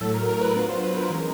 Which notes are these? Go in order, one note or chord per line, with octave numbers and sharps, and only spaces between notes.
A2 F#3 A3 A4
A#4
A#4
B4
F#3 B3 D4 F4 B4
C5
B4
A#4
E3 G#3 C#4